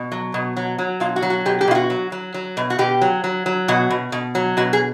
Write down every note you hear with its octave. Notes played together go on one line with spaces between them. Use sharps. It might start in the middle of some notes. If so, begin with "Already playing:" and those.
Already playing: B2
F#3
B2
F#3
F#3
B2 F4
F#4
F#3
F#4
B2 G4
G4
B2 F4
F#4
F#3
F#3
F#3
B2
F#4
B2 G4
F#3
F#3
F#3
B2 F#4
B2
B2
F#3
B2 F#4
G#4